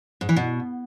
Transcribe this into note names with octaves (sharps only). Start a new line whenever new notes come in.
G#2
E3
B2